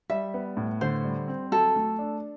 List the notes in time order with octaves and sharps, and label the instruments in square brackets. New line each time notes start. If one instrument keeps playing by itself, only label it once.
[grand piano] G3 [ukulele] E5
[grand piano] B3
A2
[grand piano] D3 [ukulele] C5
[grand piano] G3
C4
[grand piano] F#3 [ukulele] A4
[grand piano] A3
D4